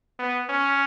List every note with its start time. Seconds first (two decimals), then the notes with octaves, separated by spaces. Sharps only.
0.19 B3
0.49 C#4